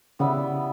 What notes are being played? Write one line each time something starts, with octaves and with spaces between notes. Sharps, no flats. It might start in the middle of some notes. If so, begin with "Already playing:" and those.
C#3 G3 B3 E4